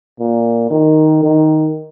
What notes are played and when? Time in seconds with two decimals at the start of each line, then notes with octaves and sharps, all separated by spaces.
0.20 A#2
0.71 D#3
1.23 D#3